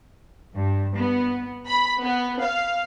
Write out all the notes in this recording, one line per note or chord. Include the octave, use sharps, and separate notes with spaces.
G2
B3
B5
B3
F5